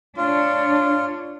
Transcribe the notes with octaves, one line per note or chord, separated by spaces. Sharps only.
D4 F4 C#5